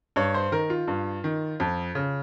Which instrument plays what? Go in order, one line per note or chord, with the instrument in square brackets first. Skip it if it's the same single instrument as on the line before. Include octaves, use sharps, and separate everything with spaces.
[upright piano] G2 C#5
C5
D#3 A#4
F4
G2
D#3
F2
C#3